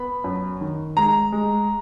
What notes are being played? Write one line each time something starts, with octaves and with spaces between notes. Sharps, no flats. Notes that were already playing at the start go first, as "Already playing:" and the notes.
Already playing: B3 B5
F#2
D#3
G#3 A#5
G#3